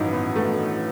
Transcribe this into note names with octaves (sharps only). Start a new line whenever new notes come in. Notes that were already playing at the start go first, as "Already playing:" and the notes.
Already playing: A1 G2 D#3 F#3 D#4 E4
B3
A3